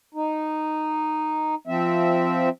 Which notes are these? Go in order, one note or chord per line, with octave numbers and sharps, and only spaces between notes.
D#4
F3 C4 E5